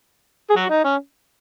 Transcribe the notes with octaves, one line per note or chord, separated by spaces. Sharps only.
G#4
F#3 F#4
D#4
C#4